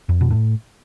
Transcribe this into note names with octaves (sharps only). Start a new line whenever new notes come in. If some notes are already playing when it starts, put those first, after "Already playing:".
F2
B2
A2